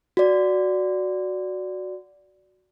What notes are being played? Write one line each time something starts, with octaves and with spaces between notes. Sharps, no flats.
F#4 D5